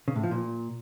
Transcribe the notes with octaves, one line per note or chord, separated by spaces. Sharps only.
C#3
A2
F3
A#2